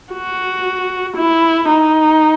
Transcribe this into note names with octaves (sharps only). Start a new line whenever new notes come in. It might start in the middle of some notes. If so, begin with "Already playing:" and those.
F#4
E4
D#4